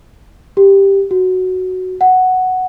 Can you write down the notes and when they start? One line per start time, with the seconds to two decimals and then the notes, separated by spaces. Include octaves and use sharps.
0.57 G4
1.11 F#4
2.01 F#5